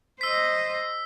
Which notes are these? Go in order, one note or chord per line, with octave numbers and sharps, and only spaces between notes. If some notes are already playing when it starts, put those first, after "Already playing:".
C5 D#5 E6 B6